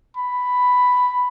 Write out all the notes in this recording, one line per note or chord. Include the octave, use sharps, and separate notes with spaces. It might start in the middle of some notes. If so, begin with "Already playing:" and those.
B5